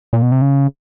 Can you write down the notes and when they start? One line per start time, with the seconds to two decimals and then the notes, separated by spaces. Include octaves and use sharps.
0.13 A#2
0.22 B2
0.32 C3
0.42 C#3